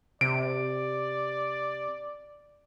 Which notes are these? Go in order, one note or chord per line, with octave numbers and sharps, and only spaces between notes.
C3 D5 D7